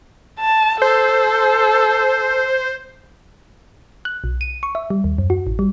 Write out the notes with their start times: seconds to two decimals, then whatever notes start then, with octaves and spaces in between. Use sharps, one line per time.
0.40 A5
0.82 A4 C5
4.05 F#6
4.24 B1
4.41 D#7
4.63 C#6
4.75 E5
4.90 G3
5.04 D#2
5.18 F#2
5.30 F#4
5.47 A1
5.59 G3